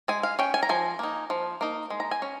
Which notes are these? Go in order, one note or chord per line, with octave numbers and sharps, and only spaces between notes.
G#3 G#5
F5
C#4 G5
G#5
A#5
F3 G#5
A#3 D#4
F3
A#3 D#4
G#3
A#5
G#5
C#4